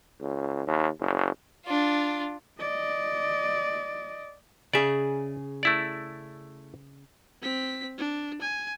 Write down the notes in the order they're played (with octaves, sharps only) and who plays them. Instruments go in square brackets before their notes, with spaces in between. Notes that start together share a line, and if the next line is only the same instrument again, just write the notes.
[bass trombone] C#2
D#2
F#1
[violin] D4 F4
[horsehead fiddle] D5 D#5
[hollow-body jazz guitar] C#3 G#4 [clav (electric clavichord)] D5 E5
[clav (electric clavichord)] A3 E4 D5
[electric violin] C4 B6
D4
G#5